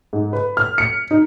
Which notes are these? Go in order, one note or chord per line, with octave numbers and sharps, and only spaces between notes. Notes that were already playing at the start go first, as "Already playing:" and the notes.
G#2
B4
F6
C#7
D#4